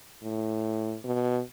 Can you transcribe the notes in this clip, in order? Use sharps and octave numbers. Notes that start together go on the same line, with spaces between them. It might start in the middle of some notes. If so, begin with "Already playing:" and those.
A2
B2